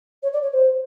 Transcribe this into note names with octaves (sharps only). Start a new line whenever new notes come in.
C#5
D5
C#5
C5